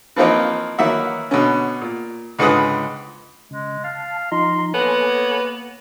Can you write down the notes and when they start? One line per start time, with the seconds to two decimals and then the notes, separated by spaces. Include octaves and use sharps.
0.16 E3 F3 A#3 C4 D#4
0.78 D#3 E3 F#3 A#3 E5 F#5
1.31 B2 D3 C#4
1.81 A#2
2.39 C#2 G#2 D3 B4 B5 D#6
3.51 C#3 G#3
3.84 F5 A5
4.32 F3 D#4 A#5 C6
4.74 A#3 B3 A4 C#5 G#5